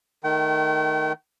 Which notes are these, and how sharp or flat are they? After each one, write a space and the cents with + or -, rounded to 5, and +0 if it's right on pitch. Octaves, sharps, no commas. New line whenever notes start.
D#3 +0 A3 -5 G5 -40